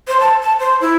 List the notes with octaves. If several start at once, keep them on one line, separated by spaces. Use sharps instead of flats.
C5
A5
A5
C5
E4